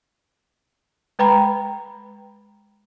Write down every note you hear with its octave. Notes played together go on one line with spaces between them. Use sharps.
G#3 B4 G5 A#5 B5